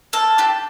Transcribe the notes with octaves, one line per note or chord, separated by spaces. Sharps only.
A#3 A4
D4 G4